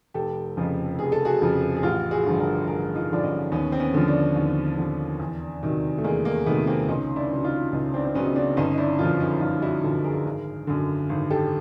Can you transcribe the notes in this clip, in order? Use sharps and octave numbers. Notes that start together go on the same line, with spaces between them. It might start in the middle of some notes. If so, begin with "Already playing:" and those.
F1 G4 A4
F2 C#3 F3
F1 G#4
A4
F#4 G#4
F2 C#3 F3
G#4
A1 F4 G4
F#4 G#4
G2 D3 F3
G#4 A#4
A1 G#4 A#4
D#4 F4
G2 D3 F3 D4
C#4 D#4
D#2 B3 C#4
C4
B3 C#4
D3 F3
C4 D4
D#2
D3 F3
E2
C3 D#3 F#3
A3
E2 G#3 A#3
G#3 A#3
C3 D#3 F#3 A3 B3
A#3 C4
C#2 C#4 D#4
D4 E4
C#3 F#3
D#4 F4
C#2 C#4 D#4
C4 D4
C4
C#3 F#3 B3 C#4
D#4
C4 D4
G1 C#4 D#4
D#4
D4 E4
F#2 D3 F3 D#4 F4
C#4 D#4
E4
G1 D#4 F4
E4 F#4
F#2 D3 F3
G#4 A#4
G#1
F#2 D3
G#1
G4 A4